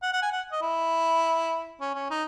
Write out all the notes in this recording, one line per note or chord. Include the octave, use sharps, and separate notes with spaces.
F#5
F#5
G#5
F#5
D#5
E4
C#4
C#4
D#4